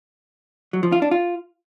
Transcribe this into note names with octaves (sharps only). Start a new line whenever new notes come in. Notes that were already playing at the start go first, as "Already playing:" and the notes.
F#3
F3
F4
D4
F4